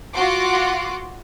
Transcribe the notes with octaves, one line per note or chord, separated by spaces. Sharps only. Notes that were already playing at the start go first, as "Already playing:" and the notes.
F4 F#4 F#5 C6 D6